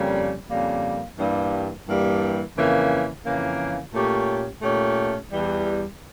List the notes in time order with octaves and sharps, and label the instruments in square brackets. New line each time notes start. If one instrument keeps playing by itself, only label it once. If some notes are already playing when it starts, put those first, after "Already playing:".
Already playing: [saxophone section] F2 C#3 G3 A#3
F2 C#3 G3 A#3
G2 E3 G3 A#3
G2 E3 G3 A#3
F2 C#3 E3 A#3
F2 C#3 E3 A#3
A#2 A3 C#4 G4 C#5
A#2 A3 C#4 G4 C#5
E2 E3 G3